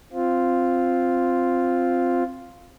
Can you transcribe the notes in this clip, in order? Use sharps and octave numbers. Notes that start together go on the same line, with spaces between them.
C4 F4